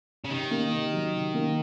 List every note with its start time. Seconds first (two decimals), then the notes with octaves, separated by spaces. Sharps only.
0.24 C#3
0.30 C3 D#3
0.51 A#3
0.72 C3
0.94 F#3
1.14 C3
1.34 A#3